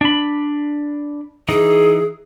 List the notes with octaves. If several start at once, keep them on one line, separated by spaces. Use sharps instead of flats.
D4 B5
E3 D#4 G#4